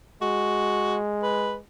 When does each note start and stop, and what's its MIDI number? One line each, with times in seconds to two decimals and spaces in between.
0.22 1.63 56
0.22 0.96 66
1.23 1.55 71